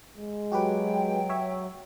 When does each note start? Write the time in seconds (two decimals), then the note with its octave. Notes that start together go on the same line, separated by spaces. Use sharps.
0.17 G#3
0.52 F#3 F#4 G4 B4 G5
1.30 C#5 E5